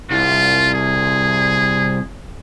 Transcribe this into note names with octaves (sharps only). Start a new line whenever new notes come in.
C2 F4
G#4